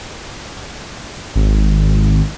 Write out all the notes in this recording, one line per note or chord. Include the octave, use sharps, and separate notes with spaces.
G#1